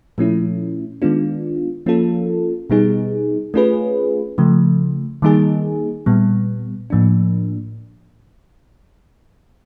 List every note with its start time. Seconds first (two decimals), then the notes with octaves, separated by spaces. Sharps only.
0.18 A#2 F3 A3 C#4 E4
1.02 D#3 G#3 B3 D4 F4
1.86 F3 A#3 C#4 F4 A4
2.70 B2 G3 B3 D#4 G#4
3.54 A3 C#4 F4 G#4 B4
4.38 C#3 F3 A3
5.22 D#3 G3 A#3 D#4 G#4
6.06 A#2 G3 B3
6.90 A2 F3 A#3 D4